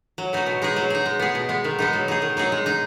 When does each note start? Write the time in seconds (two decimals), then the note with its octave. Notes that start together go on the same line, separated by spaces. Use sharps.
0.18 F#3
0.33 B3 D#4 F#4
0.46 B2
0.62 G#3 D#4 G#4
0.76 F#3
0.90 D#4 G#4
1.06 G#3
1.20 B3 G#4
1.35 B2
1.49 G#3 B3
1.64 D#3
1.79 G#3 B3 D#4
1.93 F#3
2.08 D#4 G#4
2.22 D#3
2.37 F#3 D#4 G#4
2.52 G#3
2.66 D#4 G#4